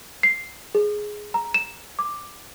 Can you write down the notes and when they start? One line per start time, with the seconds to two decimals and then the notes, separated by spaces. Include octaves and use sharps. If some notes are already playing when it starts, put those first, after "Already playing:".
0.23 C7
0.75 G#4
1.34 A#5
1.54 E7
1.99 D6